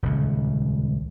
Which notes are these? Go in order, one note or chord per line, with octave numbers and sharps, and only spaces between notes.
D#1 C#2